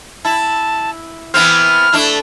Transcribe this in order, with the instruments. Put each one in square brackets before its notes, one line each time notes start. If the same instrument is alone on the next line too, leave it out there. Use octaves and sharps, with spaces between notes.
[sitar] E4 [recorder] A5
[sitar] E3 B3 C4 [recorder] F6
[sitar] A3 D4 E4